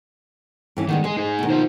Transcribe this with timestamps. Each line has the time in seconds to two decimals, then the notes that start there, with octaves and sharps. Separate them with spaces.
0.77 G2 E3 C#4
0.89 D#3 G3 G#3 B3
1.04 G#3 G#4 D#5
1.17 D#4 G#4
1.39 B2 D#3
1.50 F4 A#4 C5